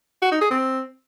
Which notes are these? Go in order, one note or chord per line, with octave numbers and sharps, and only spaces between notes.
F#4
D#4
G#4
C4